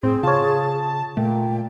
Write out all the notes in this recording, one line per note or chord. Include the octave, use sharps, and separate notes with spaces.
A2 C4 G#4
C#3 F4 C#5 A5
A#2 A3 G5